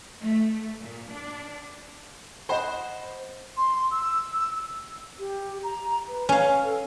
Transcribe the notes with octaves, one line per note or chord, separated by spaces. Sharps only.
A3
A#2
D4
C5 D#5 F#5 B5
C6
E6
G4
A#5
B4
C#4 F5
A4